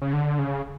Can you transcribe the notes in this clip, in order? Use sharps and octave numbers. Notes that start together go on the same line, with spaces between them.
C#3
D3
C#3